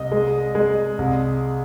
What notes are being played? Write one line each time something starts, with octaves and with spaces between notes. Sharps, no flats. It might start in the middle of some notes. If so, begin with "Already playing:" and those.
Already playing: C2 D#5
G#3
G#3
C2